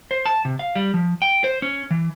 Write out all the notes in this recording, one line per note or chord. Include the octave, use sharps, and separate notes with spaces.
C5
A5
C3
F5
G3
F3
G5
C5
C#4
E3